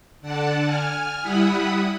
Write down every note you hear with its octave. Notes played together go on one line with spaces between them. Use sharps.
D3 D5 F#5 A5
G#5 F6
G3 E4 F#5 B5 D#6